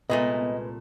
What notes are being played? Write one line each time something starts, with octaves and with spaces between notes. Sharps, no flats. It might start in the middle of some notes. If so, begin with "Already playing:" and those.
C2 A#2 G#3 A3 B3 B4 D#5